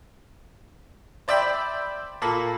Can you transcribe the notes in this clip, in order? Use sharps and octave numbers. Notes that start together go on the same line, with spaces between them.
C5 D5 E5 G5 B5
A#2 A#3 A4 B5